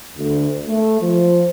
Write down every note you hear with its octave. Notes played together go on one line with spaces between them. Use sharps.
D2
A3
F3